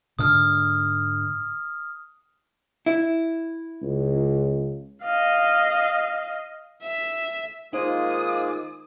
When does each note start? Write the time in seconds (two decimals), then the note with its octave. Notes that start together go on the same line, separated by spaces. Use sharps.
0.19 G#2 D3 D4 D#6 F6
2.86 E4
3.82 C#2
5.02 D#5 F5
6.83 E5
7.73 D#3 G#3 A#3 D#4 F4 G#4 C5 D#6